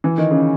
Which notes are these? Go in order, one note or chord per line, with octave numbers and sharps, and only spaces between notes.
E3
D#3
C#3